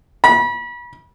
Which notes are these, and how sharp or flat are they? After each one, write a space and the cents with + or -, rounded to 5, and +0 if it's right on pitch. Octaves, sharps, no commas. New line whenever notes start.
B5 -35